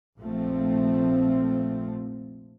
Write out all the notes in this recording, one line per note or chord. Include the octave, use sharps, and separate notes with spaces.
F1 A#1 F3 A3 C4